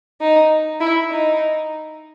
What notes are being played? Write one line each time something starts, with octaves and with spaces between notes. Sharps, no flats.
D#4
E4
D#4